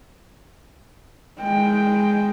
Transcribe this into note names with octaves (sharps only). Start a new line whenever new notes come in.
G#3 G5